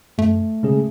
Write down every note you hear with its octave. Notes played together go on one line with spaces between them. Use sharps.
F#2 A3
C#3 G#3 C#4 G#4